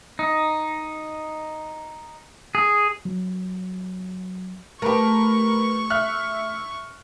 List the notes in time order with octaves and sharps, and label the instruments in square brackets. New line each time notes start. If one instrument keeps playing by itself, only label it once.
[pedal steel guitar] D#4
G#4
[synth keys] F#3
[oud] A3 G4 [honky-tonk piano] A#4 B4 [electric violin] C#6
[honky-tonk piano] E5 F6 F#6